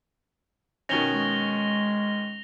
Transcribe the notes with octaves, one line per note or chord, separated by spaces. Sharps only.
B2 D#3 C#4 A#6 F7 G7
G#3